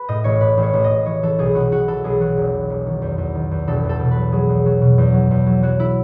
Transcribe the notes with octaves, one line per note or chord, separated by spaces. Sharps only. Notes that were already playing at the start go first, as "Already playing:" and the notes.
Already playing: B4
A2 D#5
A1 C#5
A2 B4
A1
C#5
A1
D#5
A1
E3 C#5
E3 A4
B1 G#4
B1 F#4
B1 F#4
E3 A4
B1 G#4
E3 F#4
E1
E1
E1
D#3
E2
E2
D#3
E2
E1 A4
E2
A4
B2
B4
F#3
F#3 G#4
E2
F#3
B2
E2
F#3
E2
F#3
F#3 F#4
E4